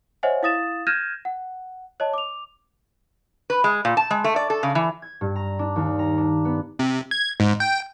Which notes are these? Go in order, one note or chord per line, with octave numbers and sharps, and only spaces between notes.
C5 C#5 D#5 E5 F#5 G#5
E4 F5 D#6 A6 E7
F6 G6 G#6 A#6 D#7 E7
F#5
C#5 D#5 A5
D6 F7
B4
G#3
A#2
A5
G#3
A3
D5
A4
C#3
E3
G#6
G2
A#5
D4
D#2
A#5
D4
B3
C3
G#6
G#2
G5